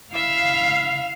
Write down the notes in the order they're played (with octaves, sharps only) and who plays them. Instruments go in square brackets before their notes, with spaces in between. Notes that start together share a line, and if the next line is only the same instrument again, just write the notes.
[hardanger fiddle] E4 E5 [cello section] F5